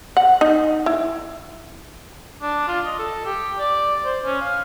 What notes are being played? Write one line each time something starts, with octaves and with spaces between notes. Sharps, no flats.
F#5
D#4
E4
D4
F4
D#5
A4
G4
D5
C5
C#4
F5